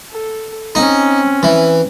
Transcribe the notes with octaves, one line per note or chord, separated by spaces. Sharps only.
A4
C4 C#4 D#4
E3